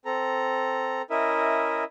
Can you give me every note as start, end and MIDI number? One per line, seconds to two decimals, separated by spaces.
0.05 1.02 60
0.05 1.02 69
0.05 1.02 82
1.10 1.84 61
1.10 1.84 64
1.10 1.84 70
1.10 1.84 75
1.10 1.84 76